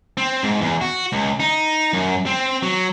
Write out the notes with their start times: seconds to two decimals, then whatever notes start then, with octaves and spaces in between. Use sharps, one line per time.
0.17 C4
0.43 G#2
0.61 E2
0.81 F#4
1.12 C#2
1.40 D#4
1.93 F#2
2.26 C4
2.63 F#3